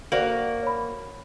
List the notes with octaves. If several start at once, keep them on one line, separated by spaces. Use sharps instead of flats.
A#3 F#4 C5 D5 F#7
C#5 B5